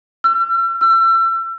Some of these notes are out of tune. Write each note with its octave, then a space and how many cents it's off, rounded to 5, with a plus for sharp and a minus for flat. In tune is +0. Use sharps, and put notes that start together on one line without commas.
E6 +45
E6 +35